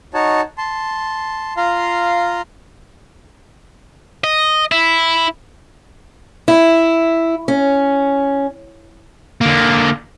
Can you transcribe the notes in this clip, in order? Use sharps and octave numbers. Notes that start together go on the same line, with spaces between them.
D#4 F#4 C#5 A5
A5 C6
F4 F5 A#5 C6
D#5
E4
E4
C#4
D3 A#3